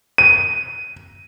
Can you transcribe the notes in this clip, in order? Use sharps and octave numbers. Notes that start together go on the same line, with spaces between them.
D#7